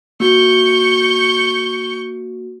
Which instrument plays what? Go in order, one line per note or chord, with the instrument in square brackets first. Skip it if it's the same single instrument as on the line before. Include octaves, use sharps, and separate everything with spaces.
[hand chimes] A#3 F#4 [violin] C#6 G6